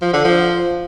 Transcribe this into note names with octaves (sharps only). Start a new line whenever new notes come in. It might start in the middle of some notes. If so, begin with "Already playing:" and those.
F3
D3
F3